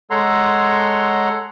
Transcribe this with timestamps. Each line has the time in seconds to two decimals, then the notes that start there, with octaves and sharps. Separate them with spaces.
0.10 G#3 A4 C#5 F#5 A#5 C6